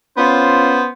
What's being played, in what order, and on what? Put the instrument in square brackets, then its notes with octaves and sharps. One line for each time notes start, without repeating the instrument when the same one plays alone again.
[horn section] B3 C#4 F4 C5